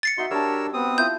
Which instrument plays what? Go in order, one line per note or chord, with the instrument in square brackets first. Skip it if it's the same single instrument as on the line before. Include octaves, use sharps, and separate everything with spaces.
[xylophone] A6 C7 C#7
[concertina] D#4 C6 [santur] F#4 E5
[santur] G3 A5 [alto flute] D4 [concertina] A#4 C#5 E6
[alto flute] B3 [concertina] C4 D#6
[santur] E4 F4 [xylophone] G6